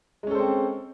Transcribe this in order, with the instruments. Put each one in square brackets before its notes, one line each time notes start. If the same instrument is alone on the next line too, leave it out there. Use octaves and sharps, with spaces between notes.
[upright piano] G#3
C#4
A4
C5
C4